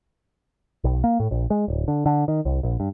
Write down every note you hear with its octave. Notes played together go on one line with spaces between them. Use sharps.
B1
A#3
A2
A#1
G#3
D1
D3
D3
D#3
C2
A#1
G2